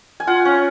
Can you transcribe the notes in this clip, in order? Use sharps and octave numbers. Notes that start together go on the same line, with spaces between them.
G#5
F4 F#5
C#4